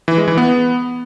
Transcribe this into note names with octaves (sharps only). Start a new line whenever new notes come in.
E3
G#3
E3
B3